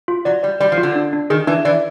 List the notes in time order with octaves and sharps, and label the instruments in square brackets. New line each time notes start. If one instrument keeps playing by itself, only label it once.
[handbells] F4
[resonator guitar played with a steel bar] F#3 [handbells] D5
[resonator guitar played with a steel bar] G3 [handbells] D5
[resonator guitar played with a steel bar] G3 [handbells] D5
[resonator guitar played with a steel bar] F3
[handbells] F4
[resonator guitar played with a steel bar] D3
[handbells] D4
D4
[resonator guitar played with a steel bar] D#3 [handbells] G#4
[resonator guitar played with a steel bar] E3 [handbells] D4
[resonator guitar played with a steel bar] E3 [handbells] D5